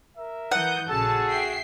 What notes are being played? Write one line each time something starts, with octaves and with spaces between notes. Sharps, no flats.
A#4 E5
E3 F#5 D#6 G6
A#1 C#3 F#4 G#4 A4 A5
E5 G5 C7